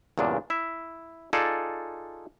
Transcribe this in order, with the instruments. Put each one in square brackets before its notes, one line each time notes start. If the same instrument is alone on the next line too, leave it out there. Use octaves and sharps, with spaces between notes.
[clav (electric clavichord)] E2 G2 A#2 C#3 D4
E4 E5
D#4 F4 G#4 A4 D5